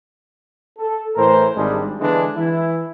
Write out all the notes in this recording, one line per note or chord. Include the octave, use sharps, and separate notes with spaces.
A4
A2 E3 A#4 C5
G#1 G3 G#3 D4
D3 E3 G#3 B3 D4
E3 E4